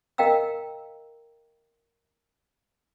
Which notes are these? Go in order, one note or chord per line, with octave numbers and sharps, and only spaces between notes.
A#4 D#5 F5 G5 A#5 E6